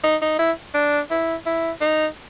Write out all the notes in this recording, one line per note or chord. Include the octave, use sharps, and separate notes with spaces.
D#4
D#4
E4
D4
E4
E4
D#4